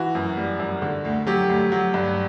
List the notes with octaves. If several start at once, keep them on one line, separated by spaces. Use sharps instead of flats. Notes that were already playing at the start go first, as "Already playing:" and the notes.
Already playing: E3 F#4
F#2
G3
F#2
D3
D2
F#3 G4
D2
F#3
G2